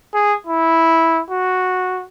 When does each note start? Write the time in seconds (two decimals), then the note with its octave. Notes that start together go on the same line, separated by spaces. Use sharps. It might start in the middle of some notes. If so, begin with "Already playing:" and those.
0.14 G#4
0.47 E4
1.30 F#4